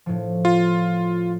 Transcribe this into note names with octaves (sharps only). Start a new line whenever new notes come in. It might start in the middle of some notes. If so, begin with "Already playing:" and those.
A2 F3
F4